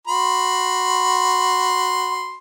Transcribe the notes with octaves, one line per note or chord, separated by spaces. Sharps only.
F#4 B5 C6